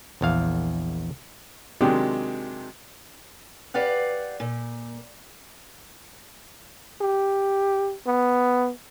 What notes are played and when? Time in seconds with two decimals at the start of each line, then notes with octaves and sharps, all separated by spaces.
0.21 A#1 E2 F5
1.81 C3 D#3 F#3 G#3 D4 G4
3.74 G4 B4 D5 F5 F#5
4.40 A#2
7.01 G4
8.07 B3